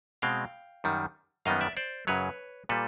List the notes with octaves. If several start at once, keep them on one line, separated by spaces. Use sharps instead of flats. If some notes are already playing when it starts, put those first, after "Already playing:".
B2 G#3 C4 F5 G5
F#2 D#3 G3
F#2 D#3 G3 B3 D#5 F5
D5 E5
C5 D5
F#2 C#3 F#3 B4 C#5
A#2 G3 A4 B4